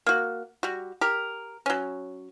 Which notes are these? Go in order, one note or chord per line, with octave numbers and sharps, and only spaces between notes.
A#3 F#4
G3 F#4
G4 A#4
F#3 C#4